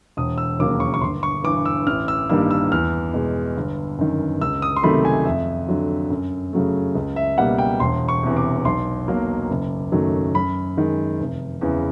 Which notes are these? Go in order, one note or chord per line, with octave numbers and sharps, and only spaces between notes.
E1 D#6
E6
D#2 C#3 F#3 A#3 D6
C#6
C#6
G1 C6
C#6
G2 E3 D6
E6
A1 F6
E6
G2 D#3 G3 A#3 E6
E6
E2 F6
B2 G#3
G1
F#2 D#3
C#2 E6
D#6
C6
C3 D#3 F#3 A3 B5
G#5
F2 E5
D3 F#3
F#2
C#3 F#3 A3
C#2
E5
B2 G3 A#3 F#5
G5
E1 C6
C#6
E2 C3
D6
B1 C6
B2 F#3 A#3
F#1
F#2 D#3 F#3 A3
F#2 B5
D#3 G#3
F1
E2 C#3 E3